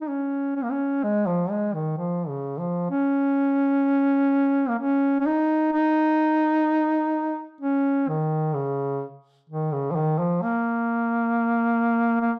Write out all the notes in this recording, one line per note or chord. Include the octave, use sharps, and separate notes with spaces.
D#4
C#4
C#4
A#3
C#4
G#3
F3
G#3
D#3
F3
C#3
F3
C#4
A#3
C#4
C#4
D#4
D#4
C#4
D#3
C#3
D#3
C#3
F3
D#3
F3
A#3
A#3